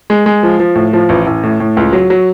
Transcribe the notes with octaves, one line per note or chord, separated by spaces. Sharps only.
G#3
G#3
F3
F3
A2
F3
A1
A1
A2
A2
C#2
F#3
F#3